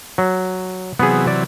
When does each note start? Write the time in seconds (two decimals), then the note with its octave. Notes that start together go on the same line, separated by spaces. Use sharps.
0.18 F#3
0.99 C3 E3 F#3 B3 G#4
1.27 D5